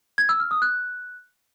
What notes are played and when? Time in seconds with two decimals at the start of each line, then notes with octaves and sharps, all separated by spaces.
0.18 G#6
0.29 E6
0.40 F6
0.51 D#6
0.62 F#6